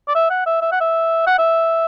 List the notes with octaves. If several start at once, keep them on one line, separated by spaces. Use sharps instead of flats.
D5
E5
F#5
E5
E5
F#5
E5
F#5
E5